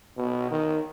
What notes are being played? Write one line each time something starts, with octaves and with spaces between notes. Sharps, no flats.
B2
D#3